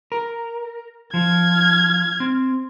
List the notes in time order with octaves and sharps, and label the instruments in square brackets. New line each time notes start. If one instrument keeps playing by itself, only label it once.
[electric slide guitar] A#4
[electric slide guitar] F3 [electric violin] F6 G#6
[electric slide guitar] C4